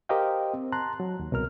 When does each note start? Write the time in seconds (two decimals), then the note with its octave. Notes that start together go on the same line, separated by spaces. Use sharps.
0.09 G4 A#4 C5 D#5 F5 G5
0.54 C4
0.72 A5 A#5 C6 F#6
1.00 F#3
1.20 D#2
1.32 C2 B2 A#4 F6